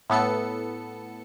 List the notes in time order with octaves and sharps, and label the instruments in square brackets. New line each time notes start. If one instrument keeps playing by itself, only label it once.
[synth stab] A2 B3 A4 C#7